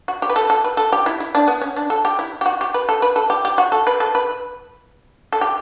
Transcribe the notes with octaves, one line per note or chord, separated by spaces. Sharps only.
F#4
G4
B4
A4
A4
B4
A4
G4
E4
E4
D4
B3
C#4
D4
A4
G4
E4
G4
F#4
G4
B4
A4
B4
A4
G4
G4
F#4
A4
B4
A4
B4
A4
G4